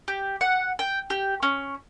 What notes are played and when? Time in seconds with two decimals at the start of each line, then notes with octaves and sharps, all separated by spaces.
0.08 G4
0.41 F#5
0.79 G5
1.10 G4
1.43 C#4